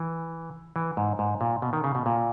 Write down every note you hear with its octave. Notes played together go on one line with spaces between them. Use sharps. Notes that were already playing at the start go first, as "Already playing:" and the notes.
Already playing: E3
E3
G#2
G#2
A#2
B2
D#3
C#3
B2
A#2